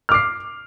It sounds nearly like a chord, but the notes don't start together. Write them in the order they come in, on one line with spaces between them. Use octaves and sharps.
F6 D6 C7